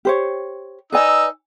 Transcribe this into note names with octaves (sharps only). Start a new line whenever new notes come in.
G4 C5 C#5
D#4 B4 D5 G#5 E6